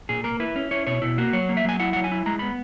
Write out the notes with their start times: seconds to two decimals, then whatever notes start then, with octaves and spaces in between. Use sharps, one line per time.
0.09 A#2 G#4
0.24 A#3 A#4
0.40 E4 B4
0.56 C#4
0.71 E4 C#5
0.87 B2 C#5
1.02 B2 E4
1.18 A#3 F#4
1.33 F#3 C#5
1.49 A#3
1.57 E5
1.65 F#3 G#5
1.80 E4 F#5
1.93 F#3 F#5
2.04 G#5
2.12 E4
2.26 G#3 A#5
2.39 B3 B5